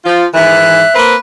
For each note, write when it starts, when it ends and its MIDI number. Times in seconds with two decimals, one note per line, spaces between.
0.05 0.25 53
0.05 0.25 65
0.34 0.83 44
0.34 0.83 51
0.34 0.83 52
0.34 0.94 76
0.34 0.94 90
0.95 1.15 58
0.95 1.15 60
0.95 1.15 71